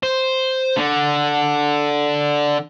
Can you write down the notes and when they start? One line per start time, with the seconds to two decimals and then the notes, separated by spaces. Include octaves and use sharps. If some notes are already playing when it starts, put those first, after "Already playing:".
0.03 C5
0.77 D3